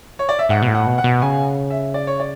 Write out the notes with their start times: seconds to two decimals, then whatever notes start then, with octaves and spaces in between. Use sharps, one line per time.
0.19 C#5
0.29 D5
0.39 E5
0.49 G#2 F#5
0.62 B2
0.68 A2
0.75 F#5
0.87 B2
0.98 F#5
1.04 B2
1.22 C#3 G#5
1.71 E5
1.94 D5
2.07 C#5
2.20 D5